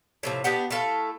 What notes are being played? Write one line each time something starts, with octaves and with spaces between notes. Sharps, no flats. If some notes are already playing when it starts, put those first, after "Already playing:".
A2 C3 F3
B3 D4 G4 F#5
A3 E4 A4 F5